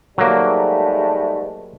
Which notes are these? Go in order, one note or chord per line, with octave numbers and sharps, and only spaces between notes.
G#2 F#3 G3 A3 A#3